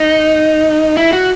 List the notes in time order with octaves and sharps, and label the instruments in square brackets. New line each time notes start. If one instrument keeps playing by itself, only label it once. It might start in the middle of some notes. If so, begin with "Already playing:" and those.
Already playing: [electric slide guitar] D#4
E4
F#4